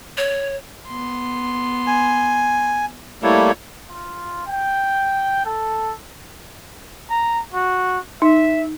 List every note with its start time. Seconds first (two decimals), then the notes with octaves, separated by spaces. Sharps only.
0.17 C#5
0.87 B3 C6
1.87 G#5
3.22 G3 A3 A#3 E4 C#5
3.90 F4
4.47 G5
5.46 A4
7.10 A#5
7.54 F#4
8.22 D#4 E5